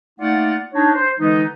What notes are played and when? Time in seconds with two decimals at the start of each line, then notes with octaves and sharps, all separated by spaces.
0.20 A3 A#3 D#4 F4 D5 F#5
0.74 D4 D#4 C#5
0.94 C5
1.19 D3 E3 G#3 B3 D#4